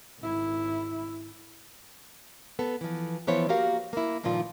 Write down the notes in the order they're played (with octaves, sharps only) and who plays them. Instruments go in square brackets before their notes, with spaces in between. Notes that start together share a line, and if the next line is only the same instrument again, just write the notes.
[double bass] G#1 E4
[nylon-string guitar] B3 A4
E3 F3
E3 F3 B3 E4 C5 C#5
A#3 F#4 G4 A#4 F5
A#3 E4
G2 A#2 D#3 F3 F4